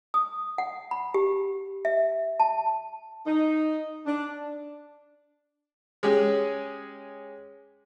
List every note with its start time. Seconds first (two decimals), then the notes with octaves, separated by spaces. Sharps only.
0.14 D#6
0.58 F#5
0.91 B5
1.14 G4
1.85 E5
2.40 A5
3.26 D#4
4.06 D4
6.03 G#3 C#4 G4 G#4